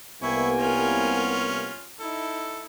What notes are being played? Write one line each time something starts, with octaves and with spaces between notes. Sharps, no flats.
C2 A#3 B3 E4 G5 G#5 C#6
C#4 F4
D#4 E4 A4